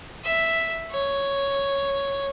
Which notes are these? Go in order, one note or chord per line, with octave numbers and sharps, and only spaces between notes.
E5
C#5